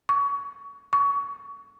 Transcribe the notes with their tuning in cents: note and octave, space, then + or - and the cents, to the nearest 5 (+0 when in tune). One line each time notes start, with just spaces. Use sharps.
C#6 +25
C#6 +25